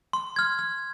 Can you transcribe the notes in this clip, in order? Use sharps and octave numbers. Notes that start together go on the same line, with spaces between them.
C6
F6 G#6
F6